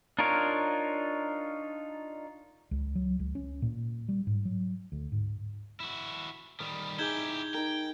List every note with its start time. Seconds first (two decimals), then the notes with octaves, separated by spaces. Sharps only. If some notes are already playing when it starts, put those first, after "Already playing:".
0.19 D4 D#4 F4 A#4 C#5
2.71 C#2
2.95 F#3
3.19 C#2
3.35 C#4
3.62 A#2
4.09 G3
4.27 G#2
4.45 F#3
4.92 D2
5.12 G#2
5.80 E4 F#4
6.60 D#3 G3 B5
6.99 D#4 E4 G4 G#4 G6 G#6 G7
7.54 D#4 A#4 G5